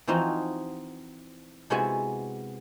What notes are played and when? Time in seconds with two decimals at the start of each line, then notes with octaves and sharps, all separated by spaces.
0.07 E3 F3 C4 D#4 F4 F#4
1.70 C3 G#3 B3 E4 F#4 G#5